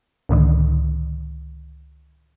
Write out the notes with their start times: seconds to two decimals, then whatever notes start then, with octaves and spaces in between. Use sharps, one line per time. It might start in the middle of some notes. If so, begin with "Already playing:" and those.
0.29 C#2 A2 D3 D#3